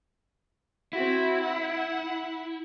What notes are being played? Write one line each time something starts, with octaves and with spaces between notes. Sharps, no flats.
C4 E4 F#4
F#5